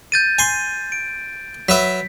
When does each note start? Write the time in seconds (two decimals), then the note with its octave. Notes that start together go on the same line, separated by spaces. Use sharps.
0.12 G6 A6 D#7
0.39 G#5 C6
0.92 D7
1.69 F#3 B4 E5 B6